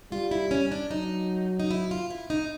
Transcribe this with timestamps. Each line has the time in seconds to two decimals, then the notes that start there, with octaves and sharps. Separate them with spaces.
0.12 G3 F4
0.31 E4
0.51 C#4
0.72 D4
0.91 F#3 D#4
1.59 D#4
1.71 E4
1.91 F4
2.10 E4
2.30 D#4